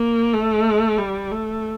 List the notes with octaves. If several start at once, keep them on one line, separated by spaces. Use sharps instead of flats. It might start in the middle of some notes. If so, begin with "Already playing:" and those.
Already playing: A#3
A3
G3
A3